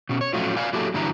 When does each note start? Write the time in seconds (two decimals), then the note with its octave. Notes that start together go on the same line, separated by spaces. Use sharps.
0.09 B2 C#4
0.21 C#5
0.33 A2 F3 F#3 A3 C#4 F4
0.57 B4 D5 F5 G#5
0.73 F#3 A#3 E4 G4 A4
0.94 G2 D3 E3 F#3 E4 A#5